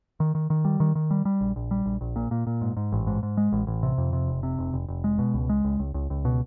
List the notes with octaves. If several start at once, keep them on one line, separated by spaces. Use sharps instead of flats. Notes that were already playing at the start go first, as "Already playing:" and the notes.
D#3
D#3
D#3
G3
D#3
D#3
G3
G3
A#1
A#1
G3
A#1
A#1
A#2
A#2
A#2
G#2
G#2
A1
G#2
G#2
G#3
A1
A1
C3
F2
C3
F1
C3
F1
F1
F1
G#3
B2
C#2
G#3
C#2
C#2
C#2
C#2
B2